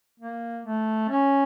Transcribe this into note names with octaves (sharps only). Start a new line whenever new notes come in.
A#3
A3
C#4